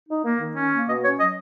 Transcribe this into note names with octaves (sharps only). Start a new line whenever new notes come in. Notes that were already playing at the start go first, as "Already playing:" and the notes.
D#4
A#3
D#3
C#4
A#3
B2 D#5
C#4 C#5
F#3 D#5